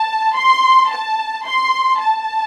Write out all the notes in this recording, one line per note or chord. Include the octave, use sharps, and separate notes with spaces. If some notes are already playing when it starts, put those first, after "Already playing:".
Already playing: A5
C6
A5
C6
A5